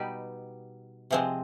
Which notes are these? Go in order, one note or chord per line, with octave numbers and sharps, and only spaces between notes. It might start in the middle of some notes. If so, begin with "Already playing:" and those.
Already playing: B2 G3 B3 D#4 G4
C3 F3 G#3 C4